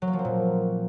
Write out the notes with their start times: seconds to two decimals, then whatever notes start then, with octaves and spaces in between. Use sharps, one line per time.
0.02 F#3
0.08 A#3
0.13 F3
0.19 C4
0.25 A#2